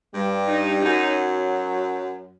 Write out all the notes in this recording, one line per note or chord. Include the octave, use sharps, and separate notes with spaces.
G2 G3
D#4
F#2 F#3 D#4